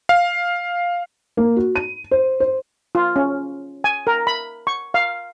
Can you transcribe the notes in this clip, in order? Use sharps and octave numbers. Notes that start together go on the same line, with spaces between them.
F5
A#3
F#4
D#7
C5
C5
F4
C#4
G#5
A#4
B5
C#6
F5